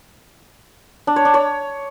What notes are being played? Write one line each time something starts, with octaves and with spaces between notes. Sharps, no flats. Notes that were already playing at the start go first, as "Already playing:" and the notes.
D4
C#5
D4
C#5